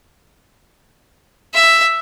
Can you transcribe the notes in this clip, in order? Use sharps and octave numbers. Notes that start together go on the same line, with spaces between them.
E5